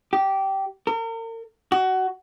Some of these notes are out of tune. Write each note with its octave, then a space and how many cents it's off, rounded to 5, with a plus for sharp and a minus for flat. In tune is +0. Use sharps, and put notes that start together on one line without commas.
G4 -15
A#4 -40
F#4 +20